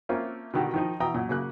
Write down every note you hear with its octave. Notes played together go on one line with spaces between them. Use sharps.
A3 A#3 C4 C#4 F4 A#4
B2 D3 D#3 G4
D#3 F3 D#4
B2 E3 G5 A#5 D#6
F#2 A#2
C#3 F#3 A#3 F#6